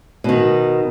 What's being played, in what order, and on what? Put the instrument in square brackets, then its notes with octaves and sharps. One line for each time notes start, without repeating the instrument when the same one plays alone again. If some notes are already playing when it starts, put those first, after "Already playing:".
[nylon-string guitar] B2 D#3